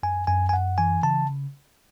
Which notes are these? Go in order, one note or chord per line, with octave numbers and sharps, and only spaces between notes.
F#2 G#5
F#2 G#5
G#5
F#2 F#5
E3 G#5
C#3 A5